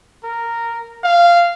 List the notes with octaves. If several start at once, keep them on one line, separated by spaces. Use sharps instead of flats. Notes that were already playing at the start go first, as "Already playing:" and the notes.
A#4
F5